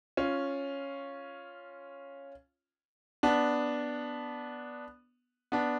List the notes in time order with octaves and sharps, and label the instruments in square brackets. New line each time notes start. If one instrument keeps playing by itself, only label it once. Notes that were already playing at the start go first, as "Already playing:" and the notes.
[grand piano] C#4 F4
B3 D4
B3 D4